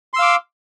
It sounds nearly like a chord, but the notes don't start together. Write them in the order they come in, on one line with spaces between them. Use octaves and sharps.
C6 E6 F5 D6